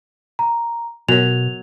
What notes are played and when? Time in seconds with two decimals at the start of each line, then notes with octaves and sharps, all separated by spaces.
0.39 A#5
1.09 B2 F#3 B3 A#4 C#5 F7